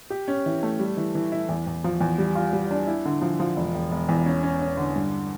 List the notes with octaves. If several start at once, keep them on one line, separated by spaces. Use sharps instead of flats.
G4
C#4
E3
A3
G3
E3
E3
E4
E2
E2
F3
E2
G3
F4
G3
D4
E4
D3
F3
F3
E1
E1
E1
E2
C#4
C#4
C#4
D3
G2